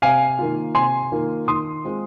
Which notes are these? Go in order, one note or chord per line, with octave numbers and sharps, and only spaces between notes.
C3 F5 G#5
D#3 A#3 F4
C3 G#5 C6
D#3 A#3 F4
D#3 C6 D#6
G#3 C4 F4